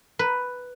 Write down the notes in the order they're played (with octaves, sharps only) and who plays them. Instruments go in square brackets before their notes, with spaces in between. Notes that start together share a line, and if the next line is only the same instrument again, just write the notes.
[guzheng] B4